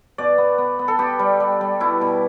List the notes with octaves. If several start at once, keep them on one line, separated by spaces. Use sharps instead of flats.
B2 D5
B3
B3
B3
A4
B3 G4
G3
G3
G3
B2 E4
B2